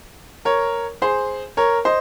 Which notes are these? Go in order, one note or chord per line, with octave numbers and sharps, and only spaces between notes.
A#4 C#5
G#4 C5
A#4 C#5
C5 D#5